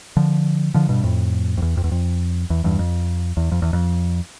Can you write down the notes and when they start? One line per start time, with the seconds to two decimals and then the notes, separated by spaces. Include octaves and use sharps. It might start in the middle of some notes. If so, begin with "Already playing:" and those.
0.17 D3 F3
0.74 D3 F3
0.89 G2 B2
1.04 F2 A2
1.57 F2
1.62 E2
1.77 F2
1.84 E2
1.91 F2
2.50 E2
2.64 E2 G2
2.79 F2
3.37 E2
3.52 F2
3.62 E2
3.73 F2